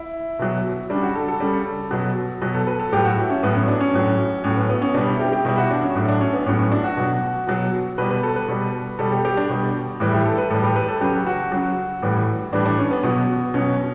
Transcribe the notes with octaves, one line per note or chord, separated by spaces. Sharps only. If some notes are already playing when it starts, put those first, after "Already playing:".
Already playing: E4
B2 F#3
C#3 G3 D4
F#4
A4
A4
C#3 G3
B2 F#3
B2 F#3 B4
A4
B4
A4
A2 F#3 G4
F#4
E4
C#4
A2 F#3 B3
C#4
D4
C#4
A2 F#3
A2 F#3 C#4
B3
B3
C#4
B2 G3 D4
E4
G4
G4
B2 G3 E4
F#4
D4
C#4
A2 F#3 E4
D4
C#4
B3
A2 F#3 C#4
C#4
D4
F#4
B2 F#3
B2 F#3
B2 G3 B4
B4
A4
B4
B2 G3
B2 G3 A4
G4
G4
D4
B2 G3
A2 E3 G3 E4
G4
A4
B4
A2 E3 G3 A4
G4
B4
A4
C#3 F#3 G4
F#4
C#3 F#3
A2 E3 G3
A2 E3 G3 D4
D4
C#4
B3
B2 F#3
B2 F#3 C#4